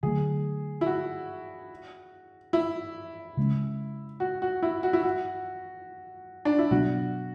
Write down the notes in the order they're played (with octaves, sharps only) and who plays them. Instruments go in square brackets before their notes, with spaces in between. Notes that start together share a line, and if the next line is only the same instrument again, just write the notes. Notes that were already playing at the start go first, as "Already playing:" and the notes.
[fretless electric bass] D3 F#3 A3 [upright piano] G#4
[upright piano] E4
F#4
E4
[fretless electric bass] C#3 G#3 C#4
[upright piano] F#4
F#4
E4
F#4
E4
F#4
D4
E4
[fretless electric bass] B2 F#3 B3 D4 [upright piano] F#4